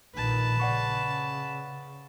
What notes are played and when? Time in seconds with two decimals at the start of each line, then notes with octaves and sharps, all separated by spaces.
0.15 A#1 A#2 D#3 B4 A5
0.60 C#3 D5 F#5 C#6